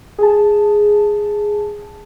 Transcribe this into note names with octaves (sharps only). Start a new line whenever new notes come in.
G#4 A5